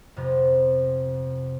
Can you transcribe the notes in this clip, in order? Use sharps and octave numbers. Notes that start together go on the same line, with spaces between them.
F2 C3 B3